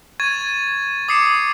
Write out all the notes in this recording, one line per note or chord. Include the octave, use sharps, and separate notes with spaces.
C#6 G#6 A6 D#7
D6 D#6 C7 C#7 E7